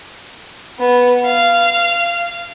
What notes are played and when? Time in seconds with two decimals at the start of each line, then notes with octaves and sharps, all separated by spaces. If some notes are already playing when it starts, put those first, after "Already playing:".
0.80 B3
1.26 F5